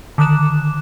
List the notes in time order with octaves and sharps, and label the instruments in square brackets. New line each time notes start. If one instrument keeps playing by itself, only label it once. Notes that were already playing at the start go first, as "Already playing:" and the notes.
[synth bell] D3 D#3 D6 F#6 E7